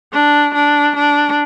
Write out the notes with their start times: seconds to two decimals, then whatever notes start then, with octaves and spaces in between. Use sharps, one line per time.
0.12 D4
0.54 D4
0.96 D4